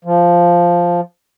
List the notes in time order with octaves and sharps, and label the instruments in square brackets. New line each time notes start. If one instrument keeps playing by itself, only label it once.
[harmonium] F3